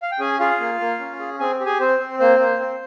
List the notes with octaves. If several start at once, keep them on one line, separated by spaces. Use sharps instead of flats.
F5
G5
C#4 G#4 G#5
F4 G#4 F5
A#3
A#3
C#4
G#4
C4 G#4 G#5
G4
G#4 G#5
C4 C5
C4
A#3 C5
A#3
C4